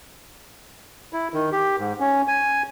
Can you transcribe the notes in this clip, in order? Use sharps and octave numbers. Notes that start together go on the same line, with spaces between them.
E4
D#3
G4
G#2
C#4
G#5